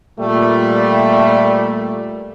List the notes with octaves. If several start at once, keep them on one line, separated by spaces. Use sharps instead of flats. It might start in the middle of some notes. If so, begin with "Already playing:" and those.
A#2 G3 A3